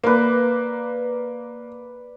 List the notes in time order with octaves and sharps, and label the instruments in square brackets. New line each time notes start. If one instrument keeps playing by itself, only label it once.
[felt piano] A#3 [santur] B4 D5